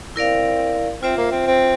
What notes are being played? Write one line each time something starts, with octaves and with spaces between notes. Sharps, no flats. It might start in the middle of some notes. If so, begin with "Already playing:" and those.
C4 E4 A#4 D5 F5
C4 F4 C5 E5
A#3
C4
C4